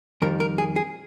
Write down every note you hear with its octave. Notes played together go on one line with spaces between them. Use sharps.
F2 D#3 G3 A#4
A#4
G#4
G#4